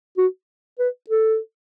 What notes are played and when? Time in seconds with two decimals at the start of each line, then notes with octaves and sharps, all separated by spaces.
0.18 F#4
0.79 B4
1.10 A4